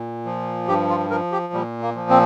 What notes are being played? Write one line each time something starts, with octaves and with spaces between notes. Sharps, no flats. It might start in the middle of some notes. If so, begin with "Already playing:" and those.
Already playing: A#2
F3
G2 G4
F4
F3 A#4
G4
A#2 G3
A#3
F3
C4